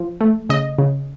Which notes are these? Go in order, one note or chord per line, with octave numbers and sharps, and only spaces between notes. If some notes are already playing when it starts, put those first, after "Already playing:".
Already playing: F3
A3
C#3 D#5
C#3